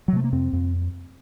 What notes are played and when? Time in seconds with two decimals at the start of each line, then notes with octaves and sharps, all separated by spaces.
0.08 F#3
0.13 C3 A3
0.24 A#3
0.32 F2 C4
0.53 F2